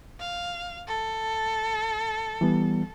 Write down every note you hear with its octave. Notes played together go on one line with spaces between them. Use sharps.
F5
A4
E3 G3 B3